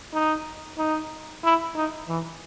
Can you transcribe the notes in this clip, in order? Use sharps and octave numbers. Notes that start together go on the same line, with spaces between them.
D#4
D#4
E4
D#4
E3